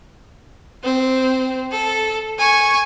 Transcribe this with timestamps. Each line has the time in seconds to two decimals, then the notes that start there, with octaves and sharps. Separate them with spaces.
0.84 C4
1.72 A4
2.39 G#5 C#6